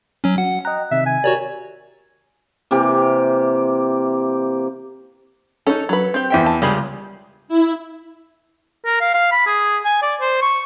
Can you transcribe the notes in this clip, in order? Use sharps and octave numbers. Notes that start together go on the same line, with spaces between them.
F#3 C#4
F#3 F#5
D#5 G5 A#5 F#6
C3 D#3 E5
G#5
F#4 G4 A#4 C#5 D5
C3 E3 A#3 G4
C#4 D#4 A4
F#3 B4
C4 G4
E2 E5 G5
A5
C#2 G3 G4 G#4
E4
A#4
F5
F5
B5
G#4
G#5
D5
C5
C#6